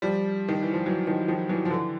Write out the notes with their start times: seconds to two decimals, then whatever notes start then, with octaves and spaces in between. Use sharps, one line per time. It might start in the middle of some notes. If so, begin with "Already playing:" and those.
0.02 F3 G3
0.48 D#3
0.62 E3
0.74 F3
0.86 E3 F#3
1.07 D#3 F3
1.28 D#3 F3
1.49 E3 F#3
1.65 F3
1.70 D3 E3